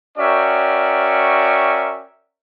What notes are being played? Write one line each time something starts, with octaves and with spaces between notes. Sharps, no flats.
C#4 F#4 A#4 D5 E5 G5